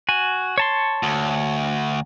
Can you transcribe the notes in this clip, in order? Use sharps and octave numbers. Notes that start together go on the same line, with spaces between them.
F#4 G#5
C#5 A5 C6
D2